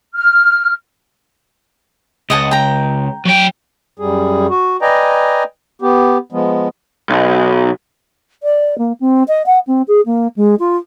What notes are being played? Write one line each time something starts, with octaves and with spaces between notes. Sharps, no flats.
F6
C#2 D#5 F#5 A5
G5 A#5
F#3 G5
F#2 G3 G#4
F#4
B4 D5 D#5 G5 G#5 A#5
B3 G4
F3 G#3 B3
B1
D5
A#3
C4
D#5
F#5
C4
G#4
A#3
G#3
F4